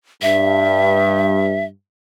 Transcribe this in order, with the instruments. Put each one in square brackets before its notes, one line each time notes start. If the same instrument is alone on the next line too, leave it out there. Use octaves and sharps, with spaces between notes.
[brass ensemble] G2 [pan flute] E5